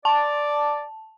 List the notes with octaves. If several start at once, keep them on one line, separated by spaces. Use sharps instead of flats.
D5 A5